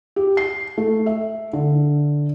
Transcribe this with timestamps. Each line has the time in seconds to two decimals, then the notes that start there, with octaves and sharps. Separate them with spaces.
0.16 G4
0.37 C7
0.78 A3
1.06 E5
1.53 D3